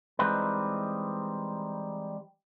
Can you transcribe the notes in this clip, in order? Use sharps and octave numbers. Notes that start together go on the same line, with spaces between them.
E3 G3 G#3 C4 D#4 B4